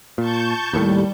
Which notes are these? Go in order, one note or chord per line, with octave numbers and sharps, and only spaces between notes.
A#2 A5 C#6 G6
D#2 A2 G3